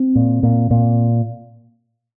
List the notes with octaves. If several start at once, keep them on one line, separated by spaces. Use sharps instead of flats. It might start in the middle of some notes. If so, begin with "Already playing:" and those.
Already playing: C4
A#2
A#2
A#2